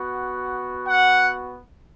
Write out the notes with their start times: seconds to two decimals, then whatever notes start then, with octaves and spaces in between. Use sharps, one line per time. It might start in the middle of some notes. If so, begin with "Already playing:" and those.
Already playing: B3 F#4
0.86 F#5